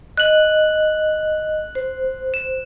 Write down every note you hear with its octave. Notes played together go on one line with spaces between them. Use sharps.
D#5 F#6 F#7
C5
E7